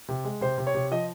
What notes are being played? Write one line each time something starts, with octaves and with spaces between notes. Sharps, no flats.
C3
G#3
C3 C5
C3
C#5
C3
F3 D#5